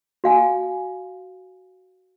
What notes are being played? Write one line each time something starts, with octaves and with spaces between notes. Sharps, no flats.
F#4 F5 G#5